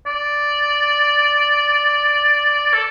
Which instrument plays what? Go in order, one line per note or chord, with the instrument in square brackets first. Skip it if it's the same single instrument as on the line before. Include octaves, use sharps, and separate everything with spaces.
[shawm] D5
A4